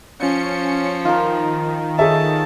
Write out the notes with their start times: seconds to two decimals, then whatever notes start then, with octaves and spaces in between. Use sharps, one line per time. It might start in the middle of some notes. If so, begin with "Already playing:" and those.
0.20 F3 C#4 C#7
1.05 D#3 F4 A#4
1.99 G#4 A4 C#5 D#5 E5 A5